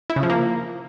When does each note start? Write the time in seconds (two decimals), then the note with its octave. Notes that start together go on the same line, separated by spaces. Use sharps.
0.10 E4
0.16 C#3
0.23 F3
0.30 A#3